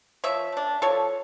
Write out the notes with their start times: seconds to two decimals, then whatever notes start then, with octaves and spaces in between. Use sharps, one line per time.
0.24 F3 C#5 E5
0.52 A3 D4
0.82 F3 A4 C#5